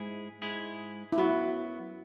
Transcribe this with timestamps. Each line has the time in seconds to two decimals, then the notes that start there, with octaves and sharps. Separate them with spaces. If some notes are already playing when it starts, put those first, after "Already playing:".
Already playing: G#2 G#3 E4 G#4
0.42 G#2 G#3 E4 G#4
1.12 E4
1.18 F#2 F#3 B3 F#4